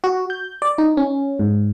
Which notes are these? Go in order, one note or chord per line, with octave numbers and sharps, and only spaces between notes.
F#4
G6
D5
D#4
C#4
G#2